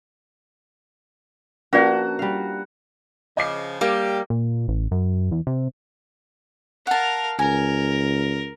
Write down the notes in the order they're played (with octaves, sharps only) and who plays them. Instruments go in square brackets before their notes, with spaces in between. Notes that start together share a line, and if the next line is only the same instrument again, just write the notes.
[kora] F3 A#3 D4 [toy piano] C#4 B4 D5 [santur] F#4 [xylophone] A#4
[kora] G3 F5
[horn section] C#3 F3 [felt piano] D#5 D6 C7
[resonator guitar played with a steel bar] G3 A#3 [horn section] G4
[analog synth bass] A#2
A1
F#2
E2
C3
[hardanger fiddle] A#4 F5 [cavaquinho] F#5 A5
[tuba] C#2 [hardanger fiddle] A#4 [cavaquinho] G#5